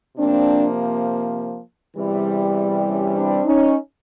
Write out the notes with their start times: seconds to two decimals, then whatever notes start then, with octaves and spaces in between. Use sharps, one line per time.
0.17 C3 F3 A#3 C4 D4
1.96 E2 C3 E3 G3
2.85 C#4
3.14 C4 D4
3.44 C#4 D#4